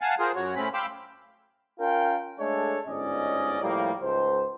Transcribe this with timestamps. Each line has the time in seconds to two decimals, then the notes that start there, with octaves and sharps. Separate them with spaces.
0.01 F5 F#5 G#5 A5
0.20 F4 G#4 A#4 C5
0.35 F#2 F#4 C#5
0.56 A2 C4 C#4 B5
0.74 F5 G5 B5 C6 D6 E6
1.80 C#4 F4 A#4 G5
2.39 G#3 A3 D4 A4 C#5
2.87 G1 G#2 C#4 D5 D#5
3.61 A2 F3 G3 A#3
4.03 C#2 G#2 C5